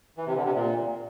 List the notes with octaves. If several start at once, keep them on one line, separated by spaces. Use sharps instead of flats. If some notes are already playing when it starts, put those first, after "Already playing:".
E3
C3
D3
C3
A#2